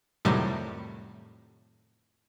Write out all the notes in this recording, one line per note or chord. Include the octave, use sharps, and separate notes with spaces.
F2 A2 C3 D#3 F#3 G3